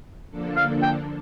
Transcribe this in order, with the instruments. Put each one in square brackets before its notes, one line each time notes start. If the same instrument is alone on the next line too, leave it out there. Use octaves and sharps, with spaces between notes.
[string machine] D3 F3 A#3 D4 A4
[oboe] F5
G5